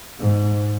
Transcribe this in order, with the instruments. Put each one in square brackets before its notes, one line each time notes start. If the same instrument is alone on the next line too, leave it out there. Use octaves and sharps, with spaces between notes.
[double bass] G#2